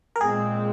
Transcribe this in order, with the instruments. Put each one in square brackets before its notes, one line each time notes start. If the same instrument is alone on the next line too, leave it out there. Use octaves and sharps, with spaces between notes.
[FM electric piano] A#4
[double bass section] A#2 G#3 C4 [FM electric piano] G#4